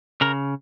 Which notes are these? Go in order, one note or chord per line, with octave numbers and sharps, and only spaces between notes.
C#3 A#4